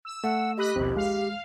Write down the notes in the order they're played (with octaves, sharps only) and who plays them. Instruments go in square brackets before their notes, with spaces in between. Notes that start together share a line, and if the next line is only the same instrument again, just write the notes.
[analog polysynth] E6
[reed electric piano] A3 [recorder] F#5
[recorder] G4 [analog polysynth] D#5 B5 F#6
[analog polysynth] A#1 D#2 [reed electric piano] B2 C4
[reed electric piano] G#3 [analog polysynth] F5